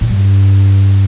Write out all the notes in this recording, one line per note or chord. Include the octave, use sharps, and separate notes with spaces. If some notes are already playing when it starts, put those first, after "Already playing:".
A#2
G2